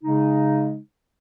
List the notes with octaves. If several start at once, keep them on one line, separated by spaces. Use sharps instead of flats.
C#3 G#3 D#4